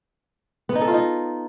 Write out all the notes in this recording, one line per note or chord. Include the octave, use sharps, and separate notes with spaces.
B3
D#4
A4
F4
D#4